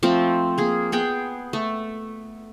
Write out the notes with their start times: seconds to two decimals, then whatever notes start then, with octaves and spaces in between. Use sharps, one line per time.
0.03 F3 A3 C4
0.58 A#3 G#4
0.92 B3 G#4 G5
1.53 A3